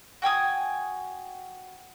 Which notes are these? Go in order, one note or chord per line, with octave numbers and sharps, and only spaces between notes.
F#4 G5 G#5 D#6